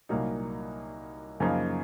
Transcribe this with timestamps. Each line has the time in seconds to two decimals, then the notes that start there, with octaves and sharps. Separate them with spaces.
0.09 C2 A#2 F#3 A#3 D#4
1.40 F#2 C#3 F3 A#3 D#4